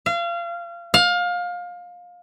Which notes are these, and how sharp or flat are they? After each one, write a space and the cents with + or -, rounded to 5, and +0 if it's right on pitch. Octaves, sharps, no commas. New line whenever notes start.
F5 -30
F5 +25